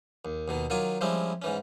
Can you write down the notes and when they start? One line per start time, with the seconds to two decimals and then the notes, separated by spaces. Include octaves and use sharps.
0.25 D#2
0.48 D#2 B2 D#3
0.70 D#3 F#3 F4 G#5 D6
1.01 F3 G3 G#3 C4 C#4 E4
1.42 G#2 E3 C#4